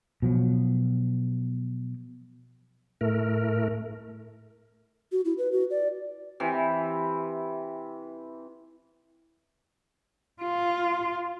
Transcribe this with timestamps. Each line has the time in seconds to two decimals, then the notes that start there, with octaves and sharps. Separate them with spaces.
0.22 B2 F3 F#3
3.01 A2 A3 A#4
5.12 F#4
5.25 E4
5.38 B4
5.52 F#4
5.71 D5
6.40 C3 E3
10.42 F4